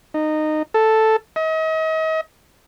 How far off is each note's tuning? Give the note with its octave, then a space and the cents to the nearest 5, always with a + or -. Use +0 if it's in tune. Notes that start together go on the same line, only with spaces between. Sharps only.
D#4 -15
A4 +0
D#5 +40